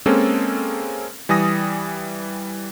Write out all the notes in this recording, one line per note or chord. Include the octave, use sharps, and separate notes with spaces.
G#3 A#3 C4 C#4 A4
E3 G3 G#5 D#6 A#6